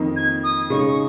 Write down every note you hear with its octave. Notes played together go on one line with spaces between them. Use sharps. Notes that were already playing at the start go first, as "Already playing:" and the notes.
Already playing: F2 D#3 A#3 D#4
G#6
D#6
C#3 G#3 D#4 C#6